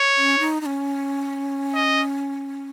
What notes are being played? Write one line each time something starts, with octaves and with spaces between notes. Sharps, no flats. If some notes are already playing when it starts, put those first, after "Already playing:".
Already playing: C#5
C#4
D#4
D#4
C#4
D#5